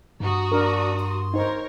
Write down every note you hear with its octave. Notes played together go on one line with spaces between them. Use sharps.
G2 F#4 A#5 D#6
D4 A#4
C6
D#4 A#4 C5 C#5